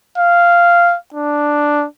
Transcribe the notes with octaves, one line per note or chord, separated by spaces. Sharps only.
F5
D4